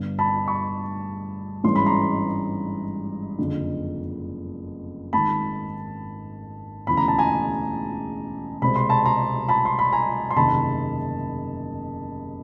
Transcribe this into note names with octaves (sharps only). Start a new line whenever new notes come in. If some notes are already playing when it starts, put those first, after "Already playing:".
Already playing: G1 G2 D3
A5 B5
B5 C#6
G#1 G2 E3 G#3 C#4 C6
B5
A#5 C6
F#1 F2 D3
G#1 G#2 D#3 A5 B5
E1 D2 C#3 E3 B5
A#5
A5
G#5 A#5
C2 B2 G#3 C4 B5
C6
A5 B5
A#5 C6
A5 B5
C6
B5
G#5 A#5
C6
F#1 E2 C3 D#3 A5 B5